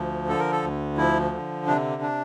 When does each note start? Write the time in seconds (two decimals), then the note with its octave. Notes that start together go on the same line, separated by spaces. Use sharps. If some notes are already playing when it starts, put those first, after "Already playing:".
Already playing: D2 F3
0.28 D3 A4
0.39 A#4
0.52 A4
0.63 D2
0.97 F3 E4
1.32 D3
1.67 C3 D4
2.02 D4